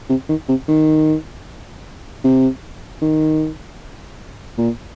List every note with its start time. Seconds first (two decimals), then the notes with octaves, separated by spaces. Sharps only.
0.09 C3
0.29 D#3
0.49 C3
0.68 D#3
2.24 C3
3.02 D#3
4.58 A#2